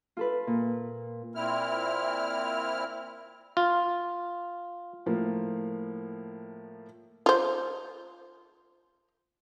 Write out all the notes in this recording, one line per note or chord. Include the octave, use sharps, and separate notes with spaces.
F4 A4 B4
A#2
A#2 C4 E4 F6
F4
A2 F3 A#3
F4 C5